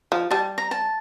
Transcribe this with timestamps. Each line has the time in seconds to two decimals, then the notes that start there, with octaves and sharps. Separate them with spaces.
0.12 F3
0.31 G3 A5
0.58 A#5
0.71 A5